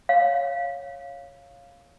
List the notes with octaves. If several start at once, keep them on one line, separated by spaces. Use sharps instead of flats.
C#5 F5